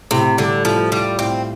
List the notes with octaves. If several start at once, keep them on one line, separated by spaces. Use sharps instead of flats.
A2 C3
D3 G3
A2 F3
G3 F4
A2 C4